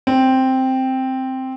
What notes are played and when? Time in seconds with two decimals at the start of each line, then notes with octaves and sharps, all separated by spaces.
0.07 C4